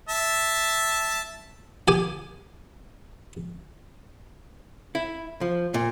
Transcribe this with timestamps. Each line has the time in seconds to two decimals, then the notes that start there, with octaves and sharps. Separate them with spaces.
0.09 E5 A5
1.88 G4 G#5
4.95 E4
5.41 F3
5.74 A#2